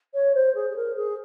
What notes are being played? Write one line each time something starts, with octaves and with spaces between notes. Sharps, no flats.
C#5
C5
G#4
G#4
A#4
G#4